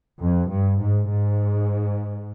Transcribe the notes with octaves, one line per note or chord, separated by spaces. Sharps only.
F2
G2
G#2
G#2